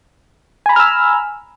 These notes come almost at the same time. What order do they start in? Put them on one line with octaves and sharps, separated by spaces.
G#5 B5 A#5 F6 E6